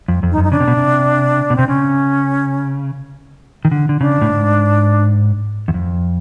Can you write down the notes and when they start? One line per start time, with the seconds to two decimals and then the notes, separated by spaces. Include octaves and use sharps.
0.08 F2
0.23 F2
0.32 D#4
0.37 F#2
0.44 D#4
0.51 C#3 D4
0.60 C3
0.68 B2
0.77 C3
1.50 B2
1.56 C3 C4
1.68 C#3 C#4
3.65 D#3
3.71 D3
3.89 D3
4.00 C#3 D4
4.21 A2
4.29 G#2
5.68 E2
5.74 F2